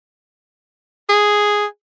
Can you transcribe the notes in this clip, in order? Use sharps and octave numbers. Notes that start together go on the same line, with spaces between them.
G#4